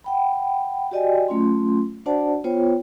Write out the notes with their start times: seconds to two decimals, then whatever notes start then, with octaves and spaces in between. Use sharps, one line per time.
0.04 F#5 G5 B5
0.91 F#4 G4 D5 D#5 G5 G#5
1.28 F#3 A3 C#4 F4 C6
2.06 D4 F#4 C5 D5 F#5 A5
2.44 B3 F4 C5 C#5 G5